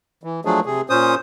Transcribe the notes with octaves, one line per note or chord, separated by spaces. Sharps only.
E3
F3 F#3 A3 D4 G#4
C3 G#4
A#2 C#4 C5 D#6